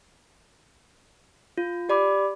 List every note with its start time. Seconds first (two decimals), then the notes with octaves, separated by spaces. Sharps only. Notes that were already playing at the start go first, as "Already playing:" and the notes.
1.58 F4
1.89 G4 D5 B5 D6